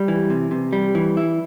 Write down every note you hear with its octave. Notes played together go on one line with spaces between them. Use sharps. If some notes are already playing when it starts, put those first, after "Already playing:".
Already playing: G3
E3
C3
C3
G3
E3
E4